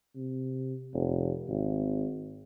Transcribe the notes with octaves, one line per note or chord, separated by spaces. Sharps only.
C3
F1
G#1